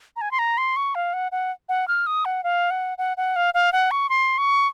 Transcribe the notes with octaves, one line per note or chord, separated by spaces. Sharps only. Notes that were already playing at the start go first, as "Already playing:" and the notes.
A#5
G#5
C6
A#5
C6
C#6
F5
F#5
F#5
F#5
F6
D#6
F#5
F5
F#5
F#5
F#5
F5
F5
F#5
C#6
C6
C#6